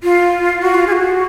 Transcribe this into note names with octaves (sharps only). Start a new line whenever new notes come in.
F4
F#4
F4
G#4
F#4